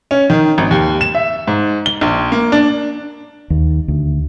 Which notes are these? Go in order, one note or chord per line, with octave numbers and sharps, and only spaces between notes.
C#4
D#3
G#1
D#2
E7
E5
G#2
G7
A#1
A#3
D4
D#2
D2